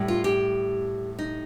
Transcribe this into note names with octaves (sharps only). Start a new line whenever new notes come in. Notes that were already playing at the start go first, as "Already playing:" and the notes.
Already playing: A2 G3
F4
G4
D#4